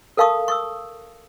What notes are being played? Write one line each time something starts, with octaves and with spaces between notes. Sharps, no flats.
A4 A#4 F5 A5 C#6 D#6
C#6 D#6 E6